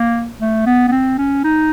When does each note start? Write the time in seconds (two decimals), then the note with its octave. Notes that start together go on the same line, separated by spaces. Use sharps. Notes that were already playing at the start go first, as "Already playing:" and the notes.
Already playing: A#3
0.41 A3
0.66 B3
0.88 B3
0.92 C4
1.18 C#4
1.44 D#4